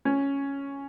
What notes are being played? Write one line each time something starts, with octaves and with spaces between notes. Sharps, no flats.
C#4